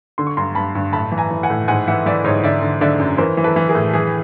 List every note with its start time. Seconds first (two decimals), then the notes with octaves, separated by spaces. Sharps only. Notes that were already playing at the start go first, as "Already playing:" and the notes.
0.18 D3 C6
0.27 C#6
0.37 G2 A#5 C6
0.55 G2 A5 B5
0.75 G2
0.93 A2 A5 B5
1.12 E3
1.18 G#5 A#5
1.30 E3
1.43 F#5 G#5
1.50 A2
1.68 G#2 F#5 G#5
1.87 E3 E5 F#5
2.06 E3 D5 E5
2.24 G#2 C#5 D#5
2.44 D3 D5 E5
2.62 D3
2.81 D3 D5 E5
2.99 F#2
3.18 E3 A#4 C5
3.37 E3
3.44 A4 B4
3.56 E3
3.68 G#4 A#4
3.75 A2
3.93 E3 G#4